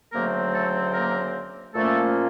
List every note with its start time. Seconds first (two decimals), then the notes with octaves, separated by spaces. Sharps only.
0.13 D2 C#3 F#3 A3 A#3 C4 A#4
0.54 A3 A4
0.94 A#3 A#4
1.75 A#2 F3 A3 A#3 C#4 A4